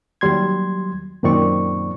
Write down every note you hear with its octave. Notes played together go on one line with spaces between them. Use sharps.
D#2 F#3 G3 C6 G#6
F#2 A#2 D#3 C4 D5 C#6